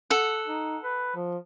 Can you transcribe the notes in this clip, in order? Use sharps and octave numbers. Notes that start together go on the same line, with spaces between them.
A4 F#5
D#4
B4
F3